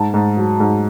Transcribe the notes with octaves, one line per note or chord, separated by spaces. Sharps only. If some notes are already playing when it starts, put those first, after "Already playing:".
Already playing: G#2 A5
G#2
F#3
G#2